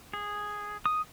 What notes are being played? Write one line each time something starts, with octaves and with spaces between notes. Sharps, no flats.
G#4
D#6